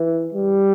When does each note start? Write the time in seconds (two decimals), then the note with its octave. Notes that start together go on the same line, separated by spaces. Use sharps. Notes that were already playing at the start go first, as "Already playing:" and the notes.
Already playing: E3
0.34 G3